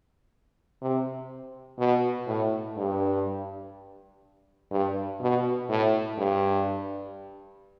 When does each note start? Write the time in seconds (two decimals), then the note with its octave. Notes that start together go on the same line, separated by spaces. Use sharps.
0.82 C3
1.79 B2
2.28 A2
2.77 G2
4.71 G2
5.21 B2
5.69 A2
6.17 G2